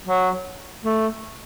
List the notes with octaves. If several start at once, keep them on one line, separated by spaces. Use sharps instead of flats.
F#3
A3